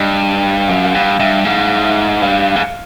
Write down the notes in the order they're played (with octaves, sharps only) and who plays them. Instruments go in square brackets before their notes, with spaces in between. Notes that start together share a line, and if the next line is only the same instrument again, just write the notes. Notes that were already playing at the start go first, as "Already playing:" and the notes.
Already playing: [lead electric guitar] G2 [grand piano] D5 D#5
[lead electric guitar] F#2 [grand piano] F5
[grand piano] F#5
F5
[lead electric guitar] G2 [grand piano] F5
[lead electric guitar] G2 [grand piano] E5
[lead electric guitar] G#2 [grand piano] F5
[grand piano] E5
[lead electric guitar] G2 [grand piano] F5
[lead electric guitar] G#2